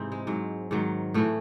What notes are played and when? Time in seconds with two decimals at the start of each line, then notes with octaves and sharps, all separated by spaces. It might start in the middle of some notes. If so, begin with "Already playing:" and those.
Already playing: G#2 C3 E3 C4 D#4
0.12 G#3
0.27 G#2 F#3
0.71 G#2 D#3 F#3
1.14 A2 E3 A3